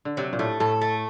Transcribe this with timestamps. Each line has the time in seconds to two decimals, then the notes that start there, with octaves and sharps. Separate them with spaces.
0.05 D3
0.17 C3 F#3
0.33 A#2
0.39 A2 A3
0.60 A2 A4
0.81 A3